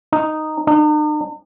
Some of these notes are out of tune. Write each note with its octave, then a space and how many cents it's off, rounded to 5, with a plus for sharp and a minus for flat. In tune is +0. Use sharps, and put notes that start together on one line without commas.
D#4 -5
D#4 -45